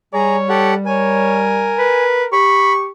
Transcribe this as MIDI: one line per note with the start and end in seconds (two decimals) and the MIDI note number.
0.14 1.92 55
0.14 0.36 68
0.14 0.72 73
0.14 0.36 82
0.49 0.74 67
0.49 0.74 69
0.49 0.74 78
0.86 2.33 70
0.86 1.43 73
0.86 2.04 80
1.79 2.25 71
2.33 2.89 67
2.33 2.73 83
2.33 2.88 85